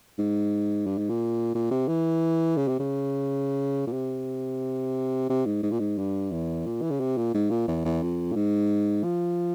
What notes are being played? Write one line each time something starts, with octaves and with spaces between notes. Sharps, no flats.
G#2
G2
G#2
A#2
A#2
C3
E3
C#3
C3
C#3
A#2
C3
C3
G#2
G#2
A#2
G#2
G2
E2
A#2
E3
C#3
C3
A#2
G#2
A#2
E2
E2
F2
A#2
G#2
F3